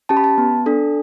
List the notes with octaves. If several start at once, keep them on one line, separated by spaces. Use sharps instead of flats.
C#4 G4 A5
B5
A5
B3
D4 A4